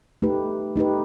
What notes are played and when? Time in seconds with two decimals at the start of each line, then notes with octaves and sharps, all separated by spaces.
0.22 A3 D#4 G4 B4
0.76 A3 D#4 G4 B4